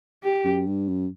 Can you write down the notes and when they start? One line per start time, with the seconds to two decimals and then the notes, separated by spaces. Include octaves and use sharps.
0.24 G4
0.45 F#2
0.67 G2
0.88 F#2